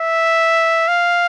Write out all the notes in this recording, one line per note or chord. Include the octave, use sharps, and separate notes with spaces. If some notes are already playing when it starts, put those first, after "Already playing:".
Already playing: E5
F5